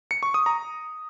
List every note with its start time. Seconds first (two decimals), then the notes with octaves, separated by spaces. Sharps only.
0.11 C#7
0.23 C#6
0.34 D#6
0.46 A#5